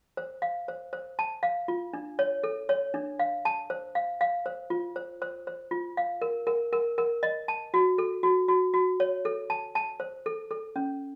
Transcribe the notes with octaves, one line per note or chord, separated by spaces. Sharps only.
C5
F5
C5
C5
A5
F5
F4
D4
C#5
A4
C#5
D4
F5
A5
C5
F5
F5
C5
F4
C5
C5
C5
F4
F5
A#4
A#4
A#4
A#4
D#5
A5
F#4
A4
F#4
F#4
F#4
C#5
A4
A5
A5
C5
A4
A4
C#4